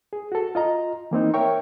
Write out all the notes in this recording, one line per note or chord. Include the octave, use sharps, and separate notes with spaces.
G#4
F#4 A4
F4 D#5 A#5
E3 A#3 C4 D#4
A#4 C#5 E5 G5 C#6